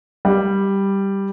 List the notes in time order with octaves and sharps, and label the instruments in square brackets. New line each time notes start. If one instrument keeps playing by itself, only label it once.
[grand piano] G3